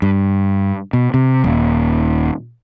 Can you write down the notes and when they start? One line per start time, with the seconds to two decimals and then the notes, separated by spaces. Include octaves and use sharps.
0.02 G2
0.93 B2
1.14 C3
1.44 D#1